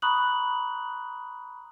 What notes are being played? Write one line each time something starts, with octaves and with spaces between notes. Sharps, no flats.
A#5 B5 C#6 D#6 F#6 F#7